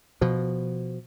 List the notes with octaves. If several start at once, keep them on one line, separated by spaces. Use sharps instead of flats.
B2 F3